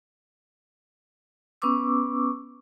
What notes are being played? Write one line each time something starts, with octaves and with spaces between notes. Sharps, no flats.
B3 C#4 B4 C#6 D6 E6